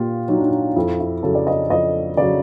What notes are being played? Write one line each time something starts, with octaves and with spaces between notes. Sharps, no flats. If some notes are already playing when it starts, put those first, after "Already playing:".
Already playing: A#2 F4 G4
F#3 D#4
D4
D#4
F2 E4
E4
C#3 F#3 A4
D5
D#5
F2 D#5
C#3 F#3 D5